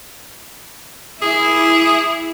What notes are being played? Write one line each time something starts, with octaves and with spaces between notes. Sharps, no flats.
E4 G#4